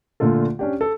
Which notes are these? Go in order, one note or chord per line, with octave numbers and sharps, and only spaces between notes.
A#2 D3 A3 F4 A4
C#4 D4 G4
A4